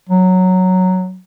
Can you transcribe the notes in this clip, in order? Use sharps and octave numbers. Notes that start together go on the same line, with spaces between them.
F#3